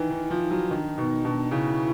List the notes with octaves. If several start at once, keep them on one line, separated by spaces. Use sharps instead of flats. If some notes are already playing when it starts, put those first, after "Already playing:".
Already playing: D#3 E3 D#4
E3
F3
F#3
D#3 D4
B2 D#4
B2 D4
C#3 E4